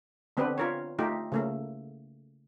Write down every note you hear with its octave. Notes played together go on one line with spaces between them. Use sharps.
D3 B3 C4 D4 G4 B4
F4 A#4 C#5
A3 D#4 F4 G4
C#3 A3 A#3